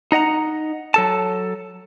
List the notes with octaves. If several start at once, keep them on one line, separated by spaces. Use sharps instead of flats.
D#4 D#5 F#5 A#5
F#3 A4 A5